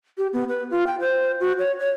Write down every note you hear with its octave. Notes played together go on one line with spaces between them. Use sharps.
G4
B3
B4
F4
G5
C5
F#4
C#5
C#5